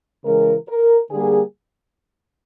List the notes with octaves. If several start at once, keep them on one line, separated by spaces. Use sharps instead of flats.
C#3 E3 G#3 A#4
A#4
D3 G3 A#3 G#4